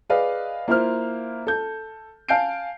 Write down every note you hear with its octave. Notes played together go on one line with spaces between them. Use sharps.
G#4 B4 D5 D#5 F5
A#3 E4 F4 C5 F6
A4 G6
F5 G#5 A5 G6 C7 D7